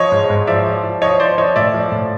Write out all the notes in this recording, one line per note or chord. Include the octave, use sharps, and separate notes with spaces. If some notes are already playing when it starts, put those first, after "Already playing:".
Already playing: F3 C#5 D#5
G#2
G#2
F3 D5 E5
F3
F3
F3 C#5 D#5
F3 C5 D5
F3 C#5 D#5
A2 D5 E5
F3
A2